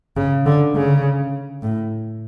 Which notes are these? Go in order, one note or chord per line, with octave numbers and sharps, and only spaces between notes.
C#3
D3
C#3
A2